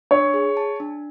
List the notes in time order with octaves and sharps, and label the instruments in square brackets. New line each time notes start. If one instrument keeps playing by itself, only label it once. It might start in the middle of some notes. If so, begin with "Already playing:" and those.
[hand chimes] D4 [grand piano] C#5
[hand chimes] G#4
A5
D4